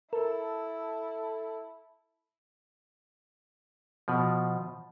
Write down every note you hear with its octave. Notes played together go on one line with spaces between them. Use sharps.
E4 A4 A#4
B2 F3